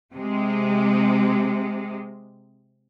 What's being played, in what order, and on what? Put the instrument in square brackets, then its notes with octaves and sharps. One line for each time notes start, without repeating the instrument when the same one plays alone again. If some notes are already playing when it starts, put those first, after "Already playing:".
[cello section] C3 G#3